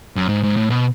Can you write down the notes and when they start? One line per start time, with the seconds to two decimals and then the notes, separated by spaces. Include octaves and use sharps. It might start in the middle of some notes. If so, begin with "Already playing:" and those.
0.16 F#2
0.29 G#2
0.43 G#2
0.56 A2
0.70 B2